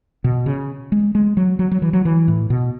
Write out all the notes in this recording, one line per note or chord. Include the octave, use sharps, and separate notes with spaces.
B2
C#3
G#3
G#3
F#3
F#3
F#3
E3
F#3
E3
A2
B2